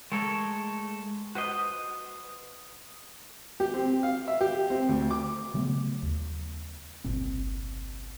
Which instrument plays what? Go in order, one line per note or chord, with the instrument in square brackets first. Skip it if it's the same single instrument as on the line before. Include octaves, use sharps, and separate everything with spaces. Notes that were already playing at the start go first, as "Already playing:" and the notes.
[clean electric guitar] G#3 A3 A4 A#4 C#5
F#4 B4 C5 D#5
[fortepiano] G4
C4
F5
E5
G4
C4
D2
D6
[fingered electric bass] C#3 F#3 A3 B3
D#2
G1 C2 A#2 C4